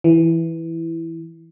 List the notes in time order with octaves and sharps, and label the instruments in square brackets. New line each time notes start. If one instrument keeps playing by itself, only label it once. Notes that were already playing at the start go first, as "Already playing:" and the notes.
[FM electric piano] E3